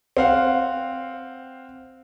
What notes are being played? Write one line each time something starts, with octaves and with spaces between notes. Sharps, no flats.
C4 F5 F#5